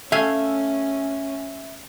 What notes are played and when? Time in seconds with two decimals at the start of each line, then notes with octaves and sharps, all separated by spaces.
0.12 A3 C#4 E5 F5 G#5